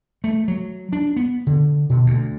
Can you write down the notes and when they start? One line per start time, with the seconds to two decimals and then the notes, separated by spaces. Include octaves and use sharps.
0.24 A3
0.48 F#3
0.92 D4
1.16 B3
1.47 D3
1.89 B2
2.06 D2